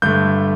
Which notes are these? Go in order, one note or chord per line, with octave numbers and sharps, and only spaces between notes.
G2 D3 A3 G6